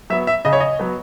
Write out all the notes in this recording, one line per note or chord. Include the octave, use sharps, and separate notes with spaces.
F#3 B3 E5
E5
C#3 D#5
C#5
D#5
F#3 B3